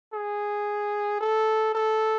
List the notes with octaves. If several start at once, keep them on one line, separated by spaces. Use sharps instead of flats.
G#4
A4
A4